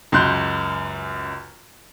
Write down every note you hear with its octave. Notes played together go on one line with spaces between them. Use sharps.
C#2 F#2 C6 F#6 G6